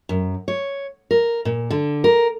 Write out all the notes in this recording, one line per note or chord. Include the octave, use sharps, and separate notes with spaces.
F#2
C#5
A#4
A#2
D3
A#4